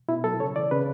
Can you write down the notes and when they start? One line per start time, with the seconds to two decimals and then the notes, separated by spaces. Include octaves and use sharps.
0.08 B2 E4
0.24 F#3 A4
0.40 C#3 C#5
0.55 E3 D5
0.71 C#3 B4